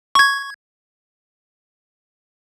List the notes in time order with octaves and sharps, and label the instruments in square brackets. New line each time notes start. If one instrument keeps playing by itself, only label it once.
[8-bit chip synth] C#6 G#6